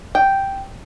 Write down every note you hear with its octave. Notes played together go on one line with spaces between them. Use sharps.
G5